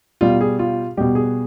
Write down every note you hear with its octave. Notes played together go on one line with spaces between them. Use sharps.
B2 G3 F4
G#4
F4
B2 G3 G4
G#4